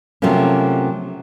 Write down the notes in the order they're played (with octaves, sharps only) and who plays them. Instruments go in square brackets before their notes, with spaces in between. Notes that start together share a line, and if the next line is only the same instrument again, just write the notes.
[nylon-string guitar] C3 F3 F#3 A3 A#3 C#4